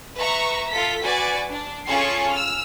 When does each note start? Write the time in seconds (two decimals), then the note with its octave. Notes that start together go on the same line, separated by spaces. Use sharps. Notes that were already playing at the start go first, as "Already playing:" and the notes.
0.17 B4 E5 A#5 C#6
0.71 F4 A4 B6
1.05 F#4 B4 D5 G#5
1.50 D4
1.87 C#4 F4 G#4 A4 C#6 C7
2.34 E6 F6